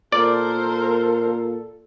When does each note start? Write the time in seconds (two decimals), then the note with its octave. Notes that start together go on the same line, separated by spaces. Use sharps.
0.12 A#2 A4 A#4 C5 D5